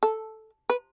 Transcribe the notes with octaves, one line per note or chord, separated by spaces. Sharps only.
A4
B4